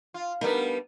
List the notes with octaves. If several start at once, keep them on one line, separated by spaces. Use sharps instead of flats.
F4
G3 B3 D4 D#4 A#4